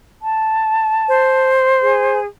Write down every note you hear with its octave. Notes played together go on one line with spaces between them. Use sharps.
A5
C5
G#4